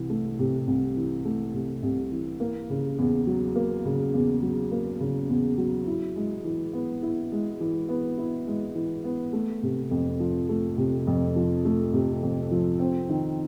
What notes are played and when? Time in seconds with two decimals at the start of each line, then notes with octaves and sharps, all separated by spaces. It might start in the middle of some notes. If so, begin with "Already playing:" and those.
Already playing: C2 C3 E3
0.10 A3
0.39 C3
0.67 C2
0.97 E3
1.25 A3
1.54 C3
1.83 C2
2.12 E3
2.40 A#3
2.70 C#3
2.98 E2
3.27 F#3
3.56 A#3
3.85 C#3
4.14 E2
4.42 F#3
4.72 A#3
5.00 C#3
5.29 E2
5.58 F#3
5.87 E4
6.16 G#3
6.44 E3
6.73 B3
7.03 E4
7.32 G#3
7.60 E3
7.89 B3
8.18 E4
8.47 G#3
8.75 E3
9.04 B3
9.33 A3
9.63 C3
9.91 F2
10.20 F3
10.49 A3
10.78 C3
11.07 F2
11.36 F3
11.65 A3
11.93 C3
12.23 F2
12.51 F3
12.79 C4
13.09 D#3